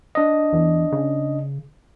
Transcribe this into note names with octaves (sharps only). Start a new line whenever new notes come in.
D4 D#5
E2
C#3